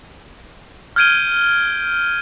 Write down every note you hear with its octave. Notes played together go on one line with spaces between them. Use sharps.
F6 G6 G#6 D7 D#7 G7